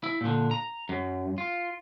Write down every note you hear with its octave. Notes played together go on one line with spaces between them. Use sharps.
E4
A#2 D3
A#5
F#2
F4